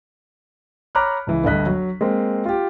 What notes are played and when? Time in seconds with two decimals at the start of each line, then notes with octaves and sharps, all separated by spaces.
0.95 C#5 A#5 B5 D6 F6 F#6
1.27 C#2 E3
1.44 G1 D2 G2 D#5 F#6 B6
1.66 F#3
2.01 G#3 A#3 C4
2.45 F4 G4